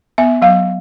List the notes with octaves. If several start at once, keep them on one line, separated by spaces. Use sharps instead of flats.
B3 E5
F#3 F5